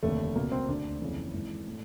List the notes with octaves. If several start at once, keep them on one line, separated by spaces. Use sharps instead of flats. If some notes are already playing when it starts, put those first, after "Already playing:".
F1 D#2 D3 A3
C#2 B2 A#3
C4
D2 D3 D4
F#1 F2 C#3 E3
G#1 G#2 E3
A2